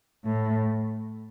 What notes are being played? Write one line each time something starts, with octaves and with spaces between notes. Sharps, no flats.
A2